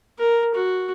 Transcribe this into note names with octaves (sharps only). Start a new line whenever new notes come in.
A#4
F#4